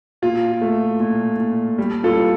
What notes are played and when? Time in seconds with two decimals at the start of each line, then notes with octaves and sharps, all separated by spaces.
0.22 A#2 F4
0.61 A3
1.00 A#2
1.40 A#2
1.78 G3
2.04 F4 A4
2.16 G3